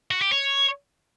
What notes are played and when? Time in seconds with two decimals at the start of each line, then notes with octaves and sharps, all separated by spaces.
0.11 F#4
0.21 G4
0.32 C#5